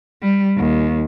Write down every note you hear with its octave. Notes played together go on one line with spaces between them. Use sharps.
G3
D#2